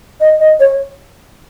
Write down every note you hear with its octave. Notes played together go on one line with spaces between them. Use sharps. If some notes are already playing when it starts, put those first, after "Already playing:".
D#5
D#5
C#5